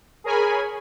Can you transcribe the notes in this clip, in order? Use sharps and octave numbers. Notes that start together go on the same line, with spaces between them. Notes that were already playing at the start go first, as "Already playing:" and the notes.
G#4 A#4 C#5 G#5 B5